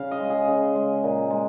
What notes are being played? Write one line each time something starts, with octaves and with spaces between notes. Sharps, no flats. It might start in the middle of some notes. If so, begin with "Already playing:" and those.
Already playing: C#3 F5
D#5
G#3
G#4
C#3
G#3
A#2
G#3